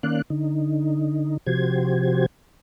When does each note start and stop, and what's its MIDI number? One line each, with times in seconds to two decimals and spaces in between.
0.03 0.22 51
0.03 0.22 58
0.03 0.22 61
0.03 0.22 74
0.03 0.22 77
0.03 0.22 90
0.30 1.37 50
0.30 1.37 63
1.47 2.26 48
1.47 2.26 53
1.47 2.26 66
1.47 2.26 67
1.47 2.26 72
1.47 2.26 92